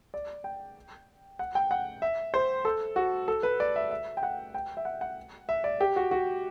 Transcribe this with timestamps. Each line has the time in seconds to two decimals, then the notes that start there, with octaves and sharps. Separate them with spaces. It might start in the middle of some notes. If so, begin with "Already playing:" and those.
0.14 D5
0.44 G5
1.39 F#5
1.55 G5
1.71 F#5
2.02 E5
2.34 C5
2.65 A4
2.96 F#4
3.28 A4
3.43 B4
3.60 D5
3.76 E5
3.91 E5
4.17 G5
4.23 F#5
4.54 G5
4.77 E5
4.85 F#5
5.01 F#5
5.49 E5
5.64 D5
5.81 G4
5.96 F#4
6.11 F#4